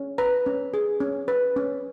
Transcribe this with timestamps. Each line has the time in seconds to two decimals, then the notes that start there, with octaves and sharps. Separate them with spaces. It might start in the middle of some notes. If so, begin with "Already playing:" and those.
Already playing: C#4
0.18 B4 A#5
0.46 C#4
0.74 G#4
1.00 C#4
1.28 B4
1.56 C#4